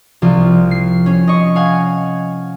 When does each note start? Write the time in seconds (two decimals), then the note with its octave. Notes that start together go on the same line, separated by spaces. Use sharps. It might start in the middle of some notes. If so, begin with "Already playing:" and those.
0.22 C2 F3 F4
0.71 C7
1.06 C#4
1.27 D#5 C#6
1.56 F5 F#5 G#5